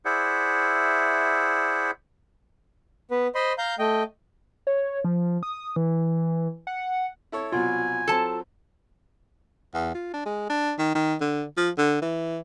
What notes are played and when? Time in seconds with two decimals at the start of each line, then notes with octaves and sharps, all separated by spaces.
0.05 E4 G#4 C5 D5 E5 F#5
3.11 B3 B4
3.35 C5 D#5 B5 C6
3.58 F5 A#5 G6
3.79 A3 D#5 G5
4.67 C#5
5.04 F3
5.43 D#6
5.76 E3
6.67 F#5
7.32 E4 A4 C#5
7.52 C2 B2 F#3 F4 G#5
8.08 F#3 C4 A4 A5
9.75 E2
9.95 F4
10.14 D4
10.26 G#3
10.50 D4
10.78 D#3
10.95 D#3
11.21 D3
11.57 F3
11.78 D3
12.02 E3